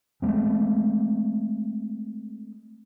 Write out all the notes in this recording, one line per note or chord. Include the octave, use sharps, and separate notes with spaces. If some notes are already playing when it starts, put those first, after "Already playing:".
G#3 A3 C4